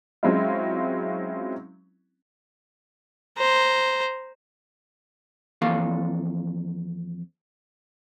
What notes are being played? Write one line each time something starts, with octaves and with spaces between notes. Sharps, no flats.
F#3 G#3 C4 C#4 E4 F4
C5 A#5
F2 E3 A#3 A4 F5